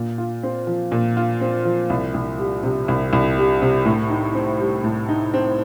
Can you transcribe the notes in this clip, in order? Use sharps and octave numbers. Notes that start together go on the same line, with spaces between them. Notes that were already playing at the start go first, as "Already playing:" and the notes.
Already playing: A#2
F4
C4
F3
A#2
F4
C4
F3
C2
C2
G3
C3
C2
C2
G3
C3
A2
D#4
C4
G3
A2
D#4
C4